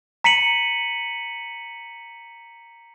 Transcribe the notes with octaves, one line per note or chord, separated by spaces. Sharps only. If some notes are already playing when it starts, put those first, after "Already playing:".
A#5 B6 C#7 D#7 F#7